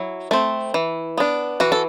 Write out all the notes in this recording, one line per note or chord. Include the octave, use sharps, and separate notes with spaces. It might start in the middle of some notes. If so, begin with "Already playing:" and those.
Already playing: F#3 E4
A3 C4
E3
B3 D4
E3 F#4
A4